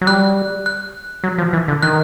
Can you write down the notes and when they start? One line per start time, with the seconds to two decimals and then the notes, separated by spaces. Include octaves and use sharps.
0.01 F#3
0.07 G3 F#6
0.66 F#6
1.24 F#3
1.38 F3
1.53 E3
1.68 D3
1.82 D#3 F#6